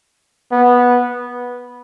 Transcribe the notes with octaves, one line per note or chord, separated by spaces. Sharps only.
B3